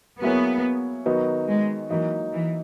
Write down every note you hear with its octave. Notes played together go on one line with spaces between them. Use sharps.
F#3 A#3 B3 E4 G#4 C#5
D#3 F#3 B3 D#4 F#4
G#3
E3 F#3 A#3 D#4
E3